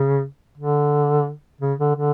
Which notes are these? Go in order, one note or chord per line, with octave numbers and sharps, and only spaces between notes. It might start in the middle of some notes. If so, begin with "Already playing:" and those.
Already playing: C#3
D3
C#3
D3
D3